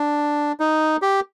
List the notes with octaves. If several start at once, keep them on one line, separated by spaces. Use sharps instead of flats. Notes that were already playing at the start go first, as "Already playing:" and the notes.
Already playing: D4
D#4
G4